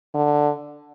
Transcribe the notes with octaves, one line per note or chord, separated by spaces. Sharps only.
D3